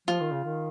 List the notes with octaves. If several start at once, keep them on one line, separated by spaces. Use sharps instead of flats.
F3 F4
D#3
C#3
D#3